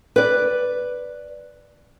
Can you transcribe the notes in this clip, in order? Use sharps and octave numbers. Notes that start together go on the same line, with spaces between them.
B4 D5